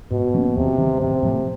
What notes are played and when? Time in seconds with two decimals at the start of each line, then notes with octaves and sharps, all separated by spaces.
0.11 G#2 B2
0.34 F3 A#3 C#4
0.56 D#2 C3
0.78 D#3 G3
1.00 A1 C3
1.22 A2 F3 A3